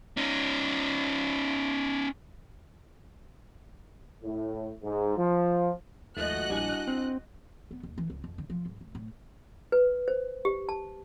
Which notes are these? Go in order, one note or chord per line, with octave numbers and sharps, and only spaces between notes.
C#4 D#4
A2
G#2
F3
D#2 G#2 F3 A3 F#4 D#5 F#6
A#1 G3 D4 E4 G#5
C4
B3
D#2
E3
C#2
F2
D3
F3
G#2
F1
A2
B4
C5
G4
A5